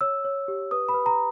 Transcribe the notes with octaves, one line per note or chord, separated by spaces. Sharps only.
C#5 E6
C#5
G4
B4 D#6
B5
B4
A#5